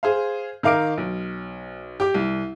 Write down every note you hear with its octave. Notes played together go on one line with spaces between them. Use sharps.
G#4 C5 F5
D#3 A#4 F5 D6 D7
B1
G4 D6
C2